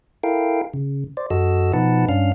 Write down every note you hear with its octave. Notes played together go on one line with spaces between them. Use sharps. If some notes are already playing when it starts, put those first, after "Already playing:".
E4 A4 A#4 F5 G5
C#3
C5 D5
F#2 F#4 A4 D#5 E6
B2 F3 D#4 B4 F#5 A5
G2 C#4 D4 F5 F6